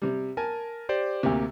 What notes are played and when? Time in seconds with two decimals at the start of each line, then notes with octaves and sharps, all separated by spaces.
0.02 C3 G3
0.37 A#4 G#5 A5
0.89 G4 C5 D5
1.23 D2 C3 A#3